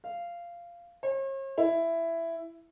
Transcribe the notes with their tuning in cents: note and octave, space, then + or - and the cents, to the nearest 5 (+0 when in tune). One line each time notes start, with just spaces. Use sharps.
F5 -15
C#5 -45
E4 +10